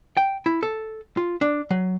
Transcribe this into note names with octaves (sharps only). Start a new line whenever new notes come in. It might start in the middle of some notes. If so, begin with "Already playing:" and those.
G5
E4
A4
F4
D4
F#3